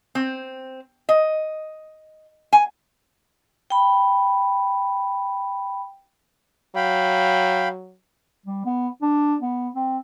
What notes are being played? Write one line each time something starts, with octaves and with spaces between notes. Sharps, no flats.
C4
D#5
G#5
G5 B5
F#3 F5 G5 B5
G3
B3
D4
B3
C4